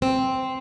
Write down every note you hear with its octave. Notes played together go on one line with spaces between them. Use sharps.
C4